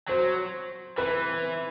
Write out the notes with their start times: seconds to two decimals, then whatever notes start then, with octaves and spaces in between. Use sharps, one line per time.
0.08 F#3 C5
0.98 E3 B4